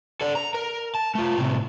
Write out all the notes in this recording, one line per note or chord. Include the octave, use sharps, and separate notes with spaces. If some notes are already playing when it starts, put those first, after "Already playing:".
A4 D5
A#5
A#4
A5
A3 F4
A2 C3